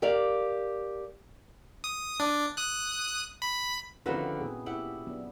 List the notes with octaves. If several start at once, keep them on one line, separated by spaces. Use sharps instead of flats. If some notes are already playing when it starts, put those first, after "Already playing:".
G4 A#4 D5 F5
D#6
D4
D#6 F#6
B5
D3 D#3 F3 C4 C#4 E4 F#4 B4
A#2 B3 G#4
E4 G4 F#5
F#3 B3 D4